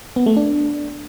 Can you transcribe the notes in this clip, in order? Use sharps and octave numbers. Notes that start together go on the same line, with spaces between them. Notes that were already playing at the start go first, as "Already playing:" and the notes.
B3
A3
D4